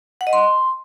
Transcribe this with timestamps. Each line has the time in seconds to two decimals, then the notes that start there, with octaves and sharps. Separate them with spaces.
0.21 F#5
0.27 D#5
0.33 C6